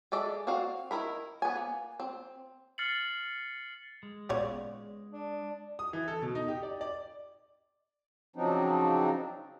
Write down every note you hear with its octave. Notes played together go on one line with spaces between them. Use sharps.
G#3 A4 D5 E5
C4 F#4 D5 F5
D#3 E4 A#4 B5
B3 G#5
A#3
C4
F6 A6 C7 C#7 F#7
G#3
G#1 A#2 C#3 B3 C#5 D5
D4
D#6
E3
A4
B2
D#4
G4
D5
D5
C#3 F3 F#3 C4 D4 D#4